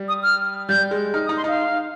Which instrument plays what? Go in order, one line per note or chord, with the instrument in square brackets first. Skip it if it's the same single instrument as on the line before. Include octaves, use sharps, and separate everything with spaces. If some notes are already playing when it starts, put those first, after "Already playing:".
Already playing: [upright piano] G3
[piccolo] D#6
F6
[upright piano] G3 [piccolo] G6
[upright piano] G#3
[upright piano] D#4 [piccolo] F6
[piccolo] D#6
[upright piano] D#4
[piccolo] C6
[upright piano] D#4 [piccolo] F5